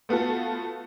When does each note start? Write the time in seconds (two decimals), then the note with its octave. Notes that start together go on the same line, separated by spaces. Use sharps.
0.09 A3 B3 F4 F#4 A4